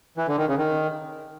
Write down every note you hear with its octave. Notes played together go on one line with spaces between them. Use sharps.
E3
D3
D#3
C#3
D#3